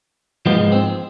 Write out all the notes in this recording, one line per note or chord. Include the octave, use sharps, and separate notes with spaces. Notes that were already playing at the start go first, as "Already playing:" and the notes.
G#2 F3 G#3 B3
C4